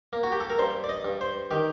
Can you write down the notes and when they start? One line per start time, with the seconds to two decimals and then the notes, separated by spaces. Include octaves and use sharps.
0.13 A#3
0.23 F#4
0.32 G4
0.40 A4
0.50 A#4
0.59 G2 C5
0.84 D5
0.89 D#5
1.05 G2
1.21 C5
1.51 D#3 G4